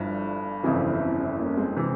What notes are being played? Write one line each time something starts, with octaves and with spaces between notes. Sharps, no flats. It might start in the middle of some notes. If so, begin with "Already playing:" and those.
Already playing: G1 G2 F3 E4
G1 F2 C#3 E3 C4 E4
C4 E4
C4 E4
A#3 C#4
G#3 C4
C3 E3